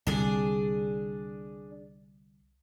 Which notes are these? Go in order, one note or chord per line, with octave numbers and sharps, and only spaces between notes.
C2 D3 D4 G#4